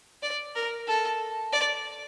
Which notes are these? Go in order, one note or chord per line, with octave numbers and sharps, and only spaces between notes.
D5
A#4
A4
D5